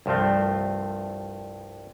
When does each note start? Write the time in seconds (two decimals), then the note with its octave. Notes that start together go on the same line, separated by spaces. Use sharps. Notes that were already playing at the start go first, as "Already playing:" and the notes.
0.06 C2 G2 F3 A3 C4